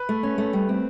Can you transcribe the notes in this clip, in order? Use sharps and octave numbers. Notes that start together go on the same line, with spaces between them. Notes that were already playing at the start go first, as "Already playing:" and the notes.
Already playing: B4
A3
C#4
A3
G3
C4